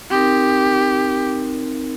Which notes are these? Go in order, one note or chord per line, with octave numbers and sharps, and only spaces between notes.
C4 D#4 G4 A#4